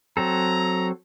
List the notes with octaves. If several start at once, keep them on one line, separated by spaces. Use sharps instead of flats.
F#3 C4 A4 A#5